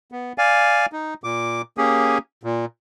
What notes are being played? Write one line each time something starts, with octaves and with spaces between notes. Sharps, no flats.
B3
D5 F5 G#5
D#4
A#2 D6
A#3 C#4 G4 G#4
A#2